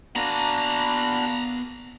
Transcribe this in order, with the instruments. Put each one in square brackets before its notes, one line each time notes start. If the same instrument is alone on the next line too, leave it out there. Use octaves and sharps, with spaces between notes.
[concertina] A#3 D4 F#4 [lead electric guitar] B3 G#5 [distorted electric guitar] A#5 B5